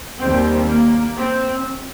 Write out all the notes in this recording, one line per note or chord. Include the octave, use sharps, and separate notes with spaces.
D#2 D#3 G3 C4
A#3
C4